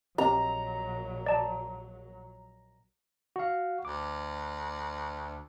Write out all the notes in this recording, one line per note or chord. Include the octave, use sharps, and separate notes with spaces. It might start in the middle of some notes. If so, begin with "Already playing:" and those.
A#1 F#3 C4 G4 A#5
D5 A5
F#4 F5
D2 D6